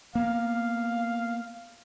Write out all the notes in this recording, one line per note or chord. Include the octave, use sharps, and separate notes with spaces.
A#3 B3 F5